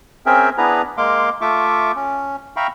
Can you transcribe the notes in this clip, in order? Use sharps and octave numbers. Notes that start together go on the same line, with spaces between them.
C4 C#4 G#4 A#4 E5 G5
B3 D4 E4 G#4 B4 A#5
G#3 A#3 F5 C6 D6
A3 F4 E5 C#6 D6
C#4
E5 F5 G5 A#5 B5 C#6